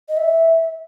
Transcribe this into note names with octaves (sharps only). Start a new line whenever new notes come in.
D#5
E5